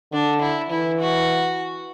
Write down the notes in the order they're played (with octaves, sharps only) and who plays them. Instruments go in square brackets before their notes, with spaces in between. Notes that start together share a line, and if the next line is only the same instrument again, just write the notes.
[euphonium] D3 [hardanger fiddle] D4
[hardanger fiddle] E4
[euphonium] E3 [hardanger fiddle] E4
[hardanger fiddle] F#4